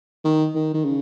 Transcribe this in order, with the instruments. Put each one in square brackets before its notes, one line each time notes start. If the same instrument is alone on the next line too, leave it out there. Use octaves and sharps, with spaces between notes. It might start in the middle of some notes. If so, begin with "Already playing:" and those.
[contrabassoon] D#3
D#3
D#3
C#3